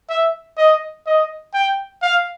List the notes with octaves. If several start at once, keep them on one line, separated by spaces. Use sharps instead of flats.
E5
D#5
D#5
G5
F5